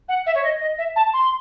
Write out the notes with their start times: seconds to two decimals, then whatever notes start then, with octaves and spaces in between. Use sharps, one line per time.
0.08 F#5
0.26 E5
0.35 C#5
0.43 D#5
0.61 D#5
0.78 E5
0.96 A5
1.13 C6